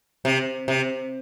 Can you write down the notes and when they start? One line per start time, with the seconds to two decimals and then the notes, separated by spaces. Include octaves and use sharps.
0.25 C3
0.68 C3